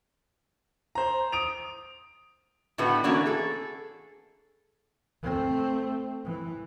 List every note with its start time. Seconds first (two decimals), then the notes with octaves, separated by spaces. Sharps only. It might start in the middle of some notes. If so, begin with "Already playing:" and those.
0.95 C5 A#5
1.32 D#6 D7 F7
2.78 A2 D3 A3 B3 F#4 B4
3.04 E3 A3 A#3 C#4 D4 F#4
3.26 G#4 A4
5.22 A3 C4
6.25 E3